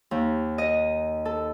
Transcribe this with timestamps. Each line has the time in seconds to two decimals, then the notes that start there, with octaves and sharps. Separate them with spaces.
0.11 D#2
0.58 D#5
1.25 A4